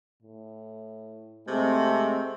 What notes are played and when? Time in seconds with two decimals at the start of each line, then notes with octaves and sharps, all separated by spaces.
0.23 A2
1.48 C3 G#3 A3 C4